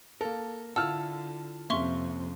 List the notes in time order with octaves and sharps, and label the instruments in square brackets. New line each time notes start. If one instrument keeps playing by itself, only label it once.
[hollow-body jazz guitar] A#3 A#4 [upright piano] A4
[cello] D3 [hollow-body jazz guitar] E4 F4 F#5 [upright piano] A5 F6 [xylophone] E6
[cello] F2 C3 [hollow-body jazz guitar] A#3 C#4 G4 [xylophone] E5 C6 C#6